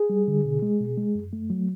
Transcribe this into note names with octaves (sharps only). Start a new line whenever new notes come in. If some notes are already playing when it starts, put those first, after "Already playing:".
Already playing: G#4
G3
D3
B2
G#3
B2
G#3
F#2
A3
F#3